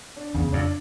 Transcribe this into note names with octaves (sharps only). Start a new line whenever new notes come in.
D4
E2 C#3
F2 D4